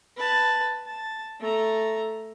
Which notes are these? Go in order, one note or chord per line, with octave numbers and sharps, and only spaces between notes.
B4 A5
A5
A3 A#5